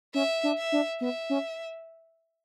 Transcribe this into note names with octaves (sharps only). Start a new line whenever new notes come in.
C#4 E5
D4
E5
D4
B3 E5
C#4